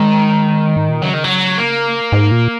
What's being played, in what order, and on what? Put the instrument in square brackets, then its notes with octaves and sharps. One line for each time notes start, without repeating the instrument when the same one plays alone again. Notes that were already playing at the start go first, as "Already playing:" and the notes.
Already playing: [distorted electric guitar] D#3 [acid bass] G#3
[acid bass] G#2
A#2
[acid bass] C#3 [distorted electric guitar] F#3
[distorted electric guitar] D#3
F#3
A#3
[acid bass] G#2
A#2